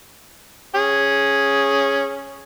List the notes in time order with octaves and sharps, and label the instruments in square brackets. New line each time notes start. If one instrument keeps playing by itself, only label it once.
[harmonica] C#4 G#4